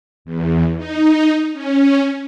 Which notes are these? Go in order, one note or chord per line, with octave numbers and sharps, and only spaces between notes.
E2
D#4
C#4